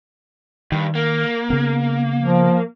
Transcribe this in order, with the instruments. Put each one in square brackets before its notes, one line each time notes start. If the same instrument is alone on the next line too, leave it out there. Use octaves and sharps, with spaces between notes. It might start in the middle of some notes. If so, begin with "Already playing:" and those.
[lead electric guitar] G2 [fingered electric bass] D#3
[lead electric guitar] A#3
[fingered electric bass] C#3 B3
[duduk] F3